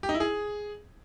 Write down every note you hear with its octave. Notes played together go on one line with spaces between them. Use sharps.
G4
D#4
E4
G#4